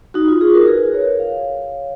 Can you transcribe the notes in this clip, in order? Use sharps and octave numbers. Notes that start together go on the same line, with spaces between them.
D#4 F#4
F4
F4 G#4
F#4 A#4
G#4 B4
A#4 C#5
C#5 F5